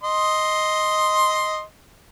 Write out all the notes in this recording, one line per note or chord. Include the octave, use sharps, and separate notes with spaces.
D#5 C6